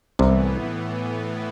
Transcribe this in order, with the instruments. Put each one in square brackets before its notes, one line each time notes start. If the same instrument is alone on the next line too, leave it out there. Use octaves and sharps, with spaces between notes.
[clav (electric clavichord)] C2 C3 [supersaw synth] A2 E3 B3